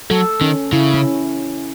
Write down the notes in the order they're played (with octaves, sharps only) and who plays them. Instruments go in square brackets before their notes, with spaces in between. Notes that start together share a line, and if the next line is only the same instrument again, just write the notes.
[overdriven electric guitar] F#3 [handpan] A4
[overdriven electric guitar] D#3 [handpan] C#4
[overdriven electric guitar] C#3 [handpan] E4
[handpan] C#4